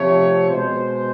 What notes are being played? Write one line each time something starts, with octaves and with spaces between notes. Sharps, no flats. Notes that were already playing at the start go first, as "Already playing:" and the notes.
Already playing: C3 F3 A3 C#5
B2 G#3 C5